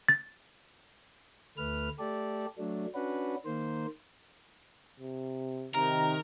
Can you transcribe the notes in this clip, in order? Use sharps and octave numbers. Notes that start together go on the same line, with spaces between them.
A6
D2 A3 B4 F6
A3 G4 A4 D5
F#3 A3 D4
C#4 D4 F#4 B4
D#3 A#3 C5
C3
C3 D#3 A#4 A#5